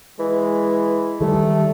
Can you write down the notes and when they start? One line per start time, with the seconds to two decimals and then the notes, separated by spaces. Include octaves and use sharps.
0.19 E3 G#3
1.21 D#3 G3 A3